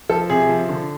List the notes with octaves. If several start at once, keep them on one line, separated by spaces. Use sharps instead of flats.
F3 A4
C3 G#4
F3
D3